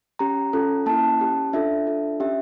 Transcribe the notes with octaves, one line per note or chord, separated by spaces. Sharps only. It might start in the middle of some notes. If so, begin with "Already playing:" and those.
C#4 G4 A#5
C#4 F4 A4
A#3 C#4 E4 A5
C#4 G4
D4 F4 A4 E5
D4 F4 A4
C#4 G4 E5